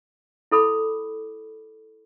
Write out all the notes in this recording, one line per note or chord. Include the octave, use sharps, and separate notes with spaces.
E4 A4 B5 D6